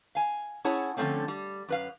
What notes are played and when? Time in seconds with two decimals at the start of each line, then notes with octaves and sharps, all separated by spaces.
0.15 F5 G#5
0.65 C#4 E4 G#4 C#5 F#5 A5
0.97 D3 F3 G#3 A3 C4 C#4
1.28 G3
1.68 F#2 B4 F5